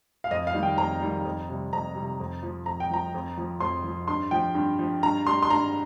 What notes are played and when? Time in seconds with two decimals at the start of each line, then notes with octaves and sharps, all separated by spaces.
0.24 F5
0.31 F2 D#5
0.47 F5
0.54 D#3 G3
0.63 G5
0.78 F2 A#5
1.02 D#3 G3
1.25 F2
1.49 C3 G3
1.73 F2 A#5
1.95 C3 G3
2.20 F2
2.43 F3
2.66 F2 A#5
2.80 G5
2.90 F3 A#5
3.14 F2
3.37 F3
3.60 F2 C6
3.84 F3
4.08 G2 C6
4.31 F3 G5
4.55 G2
4.79 F3
5.03 G2 A#5
5.27 G3 C6
5.42 C6
5.50 G2 A#5